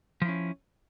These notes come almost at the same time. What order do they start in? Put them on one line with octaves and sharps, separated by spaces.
F3 E4 C#4